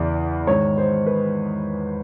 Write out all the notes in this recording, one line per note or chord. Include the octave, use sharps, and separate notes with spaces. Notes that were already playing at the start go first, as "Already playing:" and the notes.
Already playing: E2 C#3 E3 D5
G#2 D#3 C#5
C5
B4